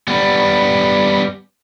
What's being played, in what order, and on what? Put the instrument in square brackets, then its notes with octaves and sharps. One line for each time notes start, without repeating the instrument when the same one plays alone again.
[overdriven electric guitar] G3 B3